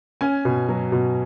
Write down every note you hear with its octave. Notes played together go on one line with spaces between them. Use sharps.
C#4 G#5
B2
F#3
B2